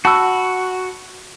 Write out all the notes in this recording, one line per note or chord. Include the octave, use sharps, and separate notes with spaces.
F#4 A5 B5 E6